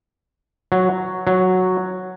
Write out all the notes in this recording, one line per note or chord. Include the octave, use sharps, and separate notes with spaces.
F#3
F#3